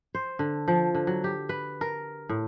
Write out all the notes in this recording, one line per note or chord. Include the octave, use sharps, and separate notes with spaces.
C5
D3
F3
D3
F#3
G4
B4
A#4
A2